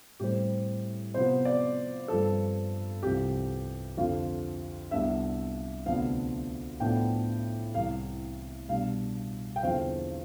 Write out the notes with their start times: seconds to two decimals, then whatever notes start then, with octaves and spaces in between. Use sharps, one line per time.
0.20 A2 G3 C4 G4
1.14 C3 F3 B3 C5
1.45 D5
2.08 G2 F3 C4 A4
3.03 C2 C3 F3 G4
3.97 F2 D3 F3 F4
4.91 C2 C3 G3 B3 D4 E5
5.86 D2 C3 F3 B3 D4 F5
6.80 A2 F3 B3 D4 G5
7.75 C2 C3 E3 F5
8.69 B2 G3 D4 F5
9.56 G5
9.63 E2 D3 F3 C4 F5